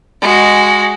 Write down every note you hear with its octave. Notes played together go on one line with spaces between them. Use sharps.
G#3 F#4